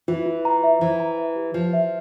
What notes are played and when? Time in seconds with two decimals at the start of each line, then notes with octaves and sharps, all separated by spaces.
0.08 E3 F4
0.26 F4
0.45 A#5
0.63 E5
0.81 E3 C5
1.00 A#5
1.18 E5
1.36 G4
1.54 F3 C5
1.73 E5